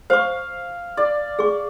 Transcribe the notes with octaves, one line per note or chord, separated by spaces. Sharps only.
C5 F5 C#6
D5
G#4 C#6